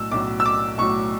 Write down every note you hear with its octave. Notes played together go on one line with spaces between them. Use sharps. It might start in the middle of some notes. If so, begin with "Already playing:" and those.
Already playing: B1 A2 F#3 E6
B1 A2 F#3 D6
E6
D6
B1 A2 F#3 C#6